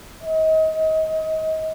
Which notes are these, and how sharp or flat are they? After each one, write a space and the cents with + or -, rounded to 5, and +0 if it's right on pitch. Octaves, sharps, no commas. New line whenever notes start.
D#5 +30